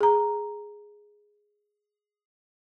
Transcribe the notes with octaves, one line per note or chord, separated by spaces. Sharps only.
G#4 A#5